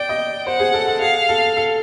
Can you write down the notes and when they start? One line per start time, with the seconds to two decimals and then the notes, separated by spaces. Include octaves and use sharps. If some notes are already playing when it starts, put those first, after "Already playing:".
Already playing: D5 G5
0.09 D#5
0.47 C5 F#5
0.60 G#4
0.74 A4
0.87 A4
1.01 G#4 F5
1.29 A4
1.57 A4